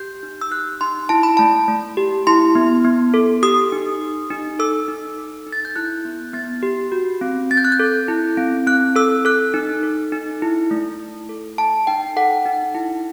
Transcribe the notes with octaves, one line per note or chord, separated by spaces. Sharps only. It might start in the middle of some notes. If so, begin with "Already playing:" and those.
Already playing: G4 G6
D#4
E6
G4 F#6
D#4 C6
E4 A5
B5
A3 A5
A3
G4
E4 C6
B3
B3
A4
G4 D#6
D#4
G4
D#4
A4 E6
D#4
A4
D#4
A6
G6
E4 F#6
B3
B3 A6
G4
F#4
C4
C4 A6
G6
F#6
G6
A4
E4
C4
C4 F#6
A4 E6
A4 F#6
D#4
A4
D#4
E4
A3
A3
A4
A4 A5
D#4 G5
A4 F#5
D#4
E4